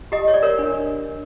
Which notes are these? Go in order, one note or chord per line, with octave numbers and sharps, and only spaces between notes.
G4 D#5
C#5
D5
A#4 C#5
D4